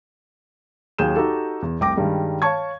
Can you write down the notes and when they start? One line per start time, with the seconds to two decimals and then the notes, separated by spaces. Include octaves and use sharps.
0.98 D#2 F#3 G#4 G6 E7
1.16 D#4 F#4 G4 A4
1.62 E2
1.80 F1 C2 G5 D6 A#6
1.97 G2 D#3 G3 G#3
2.42 C#5 F5 A5 C#6 G#6